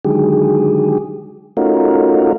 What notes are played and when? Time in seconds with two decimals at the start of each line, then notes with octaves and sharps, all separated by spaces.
0.05 D3 D#3 F#3 G#3 G4 G#4
1.57 A3 C#4 D#4 F4 F#4 A#4